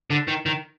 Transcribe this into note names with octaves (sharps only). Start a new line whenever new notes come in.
D3
D#3
D#3